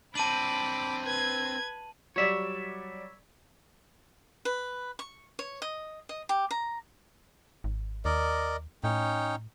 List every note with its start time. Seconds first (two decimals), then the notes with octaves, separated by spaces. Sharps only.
0.15 C4 D4 A5 B5 D6 D#7 F#7
1.04 B4 G#6
2.16 F#3 G3 C#5 D5 E5
4.45 B4
4.99 C#6
5.39 C#5
5.62 D#5
6.09 D#5
6.29 G4
6.51 A#5
7.64 G#1
8.05 D#2 A#4 D5 D#5
8.84 A2 C#4 D#4 G5